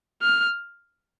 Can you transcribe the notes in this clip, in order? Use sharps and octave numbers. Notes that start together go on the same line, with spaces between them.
F6